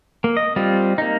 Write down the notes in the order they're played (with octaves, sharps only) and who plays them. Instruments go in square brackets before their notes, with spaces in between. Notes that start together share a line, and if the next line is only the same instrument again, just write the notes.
[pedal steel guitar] A#3
D#5
G3 C4 F4
A#3 D#4